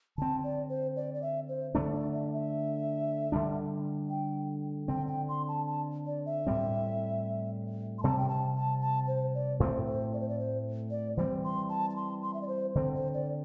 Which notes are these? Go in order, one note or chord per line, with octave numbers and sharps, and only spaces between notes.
D3 C4 A5
D5
C5
D5
D5
E5
C5
D3 A3 D4 D5
D5
E5
E5
D3 G3 D4
G5
D3 C4 G5
G5
C6
A5
A5
D5
E5
A2 G3 C4
C6
C3 G3 C4 A5
G5
A5
A5
A5
C5
D5
A2 A3 C4 C5
C5
D5
C5
D5
C5
D5
E3 G3 C4 C5
C6
A5
A5
C6
C6
E5
D5
C5
D3 C4 C5
C5
D5